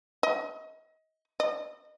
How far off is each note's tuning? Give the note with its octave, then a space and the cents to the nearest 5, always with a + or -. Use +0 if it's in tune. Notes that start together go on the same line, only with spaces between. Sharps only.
D#5 +30
D#5 -30